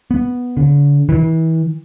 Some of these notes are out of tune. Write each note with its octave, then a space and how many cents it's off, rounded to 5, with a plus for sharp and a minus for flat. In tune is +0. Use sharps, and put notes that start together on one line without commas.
B3 -5
D3 -40
E3 -35